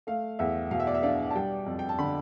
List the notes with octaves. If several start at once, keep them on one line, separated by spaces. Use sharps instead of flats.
A3 F5
E2 E5
B2 F5
E5
D5
E5
D4 F5
A5
G3 G5
F2
G5
A5
D3 B5